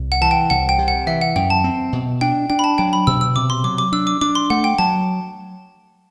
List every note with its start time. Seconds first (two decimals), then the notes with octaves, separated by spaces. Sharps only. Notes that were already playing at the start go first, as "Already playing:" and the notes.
Already playing: C2
0.12 F#5
0.21 E3 A5
0.31 G5
0.50 C2 F#5
0.69 G5
0.79 C3
0.88 F#5
1.07 E3 E5
1.21 F#5
1.36 F#2 G5
1.50 A5
1.64 C4
1.93 B2
2.21 D4 G5
2.50 D4 G5
2.59 B5
2.64 A5
2.78 F#3 G5
2.93 B5
3.07 B2 E6
3.21 E6
3.36 C3 D6
3.50 C6
3.64 F#3 D6
3.78 D6
3.92 D4 E6
4.07 D6
4.21 D4 D6
4.35 C6
4.50 A3 F#5
4.64 G5
4.79 F#3 A5